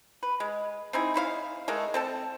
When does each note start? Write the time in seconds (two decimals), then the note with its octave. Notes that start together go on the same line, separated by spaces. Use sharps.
0.23 B4
0.40 G#3
0.93 C4 D#4 E4 G#4
1.14 D#4 E4 C5 F5
1.68 G#3 A3 A#4 D#5
1.94 C4 A4 A5